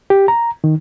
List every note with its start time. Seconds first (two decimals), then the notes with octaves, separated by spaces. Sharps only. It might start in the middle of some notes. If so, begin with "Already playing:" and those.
0.10 G4
0.28 A#5
0.64 D#3